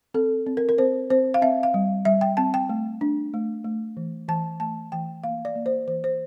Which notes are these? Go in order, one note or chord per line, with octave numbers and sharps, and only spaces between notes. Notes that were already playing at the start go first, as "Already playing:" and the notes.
C4 A4
C4
A#4
A#4
C4 C5
C4 C5
F5
C4 E5
F5
G3
G3 E5
G5
C4 A5
G5
A3
D4
A3
A3
E3
E3 A5
A3 A5
E3 G5
A#3 F5
D5
A#3
C5
E3 C5
C5